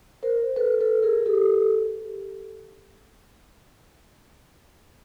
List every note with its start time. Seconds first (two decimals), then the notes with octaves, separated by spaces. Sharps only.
0.23 A#4 C5
0.56 A4 B4
0.81 A4 B4
1.02 G#4 A#4
1.26 G4 A4